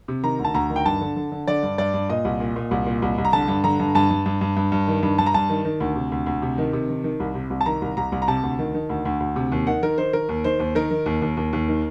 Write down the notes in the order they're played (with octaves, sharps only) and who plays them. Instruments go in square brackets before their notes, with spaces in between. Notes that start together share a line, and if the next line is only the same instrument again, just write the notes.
[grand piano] C3
D#3 A#5
D2
A5
D2 A#5
D#3
G5
G2 A5
D3
D3
D3
D3 D5
G2
G2 D5
G2
A#2 D#5
C2
A#2
A#2
C2
A#2
C2
C2
A#5
D3 A5
G2
D3 A#5
G2
G2 A5
G2
G2
G2
G2
G2
D#3
G2
G2 A5
A#5
G2 A5
D#3
D#3
D2
C3
D2
D2
C3
D#3
C3
D#3
D#3
C2
C3
C2
A5
D#3 A#5
C2
C2 A#5
C2
A#5
C3 A5
D2
D#3
D#3
D2
D2
D2
C3
D#2
D#3 F#5
D#3 A#4
D#3 C5
D#3 A#4
D#2
D#3 C5
D#2
D#3 A#4
D#3
D#2
D#2
D#2
D#2
D#3